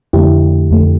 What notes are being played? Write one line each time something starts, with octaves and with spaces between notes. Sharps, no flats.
F2 D3 A3 E4 G4
F2 D3 A3